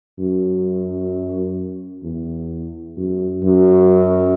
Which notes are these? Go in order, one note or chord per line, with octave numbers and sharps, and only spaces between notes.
F#2
E2
F#2
F#2